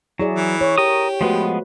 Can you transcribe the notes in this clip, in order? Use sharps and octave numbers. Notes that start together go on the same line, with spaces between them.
F#3 E4 G#4 D5
E3
C#5
G4 A#4 D#6
F3 G#3 A3 B3 F#4 B4